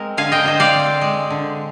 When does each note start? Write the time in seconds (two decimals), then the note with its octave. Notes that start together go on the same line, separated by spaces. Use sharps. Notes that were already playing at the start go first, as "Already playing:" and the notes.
Already playing: G#3 C4 A#4
0.17 D3 F5 G#5
0.32 D#5 G5
0.44 D3 C5 D#5
0.60 D5 F5
0.74 C4
1.01 G#3
1.30 D3